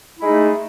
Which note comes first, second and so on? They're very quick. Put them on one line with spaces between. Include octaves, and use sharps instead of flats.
E4 G#3 D#4 A3